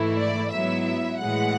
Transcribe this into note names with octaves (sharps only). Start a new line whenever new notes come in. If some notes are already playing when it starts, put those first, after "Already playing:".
Already playing: G#2 E3 A3 E4
D5
G#2 F#3 B3 E4 E5
A2 E3 G#3 F#5